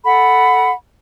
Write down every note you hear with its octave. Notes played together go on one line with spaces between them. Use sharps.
A4 F#5 B5